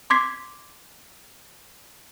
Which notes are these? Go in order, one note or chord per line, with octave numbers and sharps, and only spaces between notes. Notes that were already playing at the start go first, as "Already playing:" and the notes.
C6 D6 G#6 B6 C7